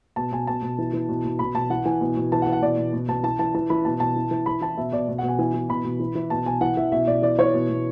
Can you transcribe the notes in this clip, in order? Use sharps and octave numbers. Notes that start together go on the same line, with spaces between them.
B2 A5
B2 G#5
B2 A5
B2
E3
E3
B2
B2
B2 B5
B2 A5
E3 F#5
E3 G#5
B2
B2
E3 A5
F#5
E3
F#5
B2 D5
B2
B2
B2 A5
E3 A5
E3 A5
E3 A5
E3 B5
B2 A5
B2 A5
E3
E3
E3 B5
E3 A5
B2 E5
B2 D5
B2
F#5
B2
G#5
E3 G#5
E3
B2 B5
B2
E3
E3
B2 A5
B2 G#5
E3 F#5
E3 E5
B2 E5
B2 D5
E3 D5
E3 C#5
B2
B2